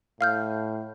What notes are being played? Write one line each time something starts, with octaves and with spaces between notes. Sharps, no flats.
A2 F5 F6 G6